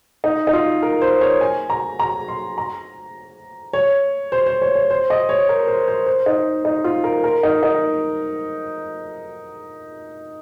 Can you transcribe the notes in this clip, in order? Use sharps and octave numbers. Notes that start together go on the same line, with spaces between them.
D#4
D#4
F4
A#4
C5
C#5
G#5
A#5
A#5
C6
A#5
C#5
C5
C5
C#5
C#5
C5
D#5
C#5
A#4
C5
C5
C5
D#4
D#4
F4
A#4
A#4
D#4
D#4